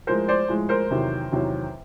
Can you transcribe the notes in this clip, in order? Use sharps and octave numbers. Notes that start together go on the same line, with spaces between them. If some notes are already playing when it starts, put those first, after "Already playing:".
A2 F3 G#3 A#4 C5
C5 D5
A2 F3 G#3
A#4 C5
E2 C3 D#3 F#3
E2 C3 D#3 F#3